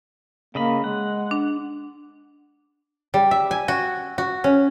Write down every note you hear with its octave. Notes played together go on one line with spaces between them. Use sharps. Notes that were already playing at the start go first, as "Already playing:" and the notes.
C#3 A#3 D#5 B5
G#3 F#5
D4
G3
E5
G#5
F#4
F#4
C#4